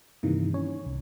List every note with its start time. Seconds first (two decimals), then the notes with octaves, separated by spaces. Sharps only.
0.23 G2 C3 D#3 E3 A#3
0.54 C#4 C#5
0.86 C2